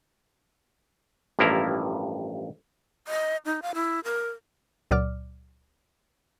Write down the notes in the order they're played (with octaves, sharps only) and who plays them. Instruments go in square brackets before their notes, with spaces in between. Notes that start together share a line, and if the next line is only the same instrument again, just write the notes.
[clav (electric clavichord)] A1 G2 F3 A#3 E4 A#5
[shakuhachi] D#5
D#4
F5
E4
A#4
[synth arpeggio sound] C#2 A#2 F#3 D5 D6 F6